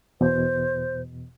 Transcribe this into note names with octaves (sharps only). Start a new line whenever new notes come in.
E2 B2 C5